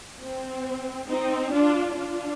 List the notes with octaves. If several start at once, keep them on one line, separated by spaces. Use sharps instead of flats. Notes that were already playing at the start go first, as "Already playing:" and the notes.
C4
C4 D#4
D4 F4
D4 F4